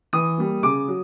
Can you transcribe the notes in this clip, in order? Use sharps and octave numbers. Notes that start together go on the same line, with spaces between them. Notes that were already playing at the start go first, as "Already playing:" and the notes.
E3 D#6
G3 A#3
C#3 D6
F#3